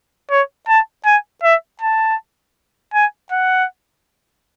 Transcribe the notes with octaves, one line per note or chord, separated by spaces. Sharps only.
C#5
A5
G#5
E5
A5
G#5
F#5